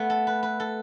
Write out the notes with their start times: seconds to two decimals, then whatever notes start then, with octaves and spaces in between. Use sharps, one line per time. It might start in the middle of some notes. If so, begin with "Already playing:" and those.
Already playing: A3 B3
0.10 A4
0.27 B4
0.43 B4
0.60 A4